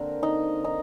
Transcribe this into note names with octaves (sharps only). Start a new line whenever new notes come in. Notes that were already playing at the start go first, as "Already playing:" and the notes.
Already playing: D3 A#3 C4 A#4
D#4
D#4